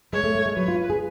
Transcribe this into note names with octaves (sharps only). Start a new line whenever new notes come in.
G#3 C#5
A3
A3
G#3
F#3 B4
F4
G#4